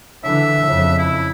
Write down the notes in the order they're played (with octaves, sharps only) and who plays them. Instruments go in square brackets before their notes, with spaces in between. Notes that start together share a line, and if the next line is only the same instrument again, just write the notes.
[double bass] D3 E3 [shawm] E5
[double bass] F2 C#3
[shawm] E4